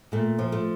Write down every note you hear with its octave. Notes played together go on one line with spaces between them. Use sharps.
A#2 A3
F3
A3